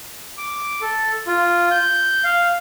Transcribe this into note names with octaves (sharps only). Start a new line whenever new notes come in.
D6
A4
F4
G6
F5